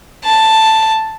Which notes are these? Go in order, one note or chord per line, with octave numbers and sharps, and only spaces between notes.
A5